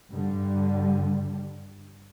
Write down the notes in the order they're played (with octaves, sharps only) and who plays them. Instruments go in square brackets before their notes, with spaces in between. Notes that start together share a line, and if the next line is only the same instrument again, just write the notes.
[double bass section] G2 D3 G3